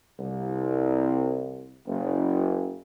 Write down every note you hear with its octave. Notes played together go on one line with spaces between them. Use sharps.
C2
F#1